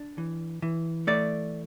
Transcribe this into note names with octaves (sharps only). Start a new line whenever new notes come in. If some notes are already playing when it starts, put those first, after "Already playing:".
Already playing: D4
E3
E3
A3 D5